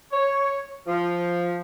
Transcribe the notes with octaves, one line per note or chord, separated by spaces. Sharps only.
C#5
F3